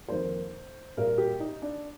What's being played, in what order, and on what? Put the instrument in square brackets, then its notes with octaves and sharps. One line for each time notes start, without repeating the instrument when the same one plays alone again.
[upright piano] F2 D#3 A#3 C5
A#2 G3 A#3 A#4
G4
D#4
D4